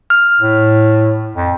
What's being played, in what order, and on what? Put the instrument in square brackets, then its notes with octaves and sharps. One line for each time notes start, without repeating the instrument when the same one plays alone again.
[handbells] F6
[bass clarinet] A2
F2